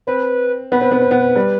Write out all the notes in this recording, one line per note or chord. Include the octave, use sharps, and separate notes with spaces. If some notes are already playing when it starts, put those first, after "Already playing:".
C4 B4
B3 B4
C4
B3
C4
B3
G3